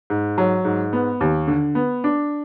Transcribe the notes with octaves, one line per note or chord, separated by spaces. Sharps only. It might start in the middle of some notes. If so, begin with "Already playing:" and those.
G#2
F#3
G#2
B3
D#2
D3
B3
D4